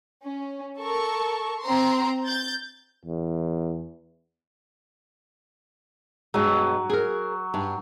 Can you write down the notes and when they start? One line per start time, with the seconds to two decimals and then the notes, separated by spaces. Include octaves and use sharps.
0.23 C#4
0.77 A4 A#4 C#6
1.62 C4 A#5 C6
2.26 G6 A6
3.05 E2
6.34 G2 B2 F#3 G#3
6.90 G#4 A#4
7.54 G2